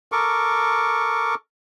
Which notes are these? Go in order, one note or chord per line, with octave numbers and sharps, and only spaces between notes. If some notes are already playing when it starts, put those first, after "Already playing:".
A4 A#4 C#6 D6